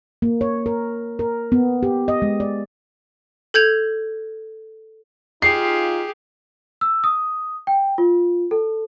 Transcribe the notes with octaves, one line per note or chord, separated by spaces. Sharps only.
A#3
C#5
A#4
A#4
B3
G4
D#5
G#3
D5
A4 G6 G#6 F7
D#4 F4 G4 G#4 C7
E6
D#6
G5
F4
A4